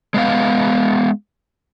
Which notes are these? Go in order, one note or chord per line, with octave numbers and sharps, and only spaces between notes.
G#3 B3 F5